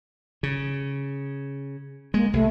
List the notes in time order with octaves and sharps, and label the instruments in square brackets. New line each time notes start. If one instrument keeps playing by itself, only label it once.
[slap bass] C#3
[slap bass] G#3 [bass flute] A#3
[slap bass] C2 [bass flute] A3